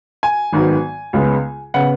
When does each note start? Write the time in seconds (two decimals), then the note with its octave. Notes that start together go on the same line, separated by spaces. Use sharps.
0.23 G#5
0.53 G#1 G#2 D#3 F#3 B3
1.13 C#2 C#3 G#3 B3
1.74 C#3 B3 F#5